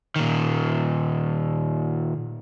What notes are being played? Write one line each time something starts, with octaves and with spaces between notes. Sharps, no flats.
A#2 D#3